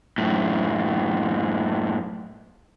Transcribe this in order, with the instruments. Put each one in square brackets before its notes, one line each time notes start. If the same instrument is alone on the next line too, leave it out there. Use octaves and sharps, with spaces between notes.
[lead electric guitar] F#2 A2